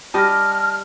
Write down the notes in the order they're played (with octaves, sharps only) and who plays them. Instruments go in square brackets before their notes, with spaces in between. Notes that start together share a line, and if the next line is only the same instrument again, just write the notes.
[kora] G3 G4 D#5 [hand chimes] A5 A#6 [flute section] F6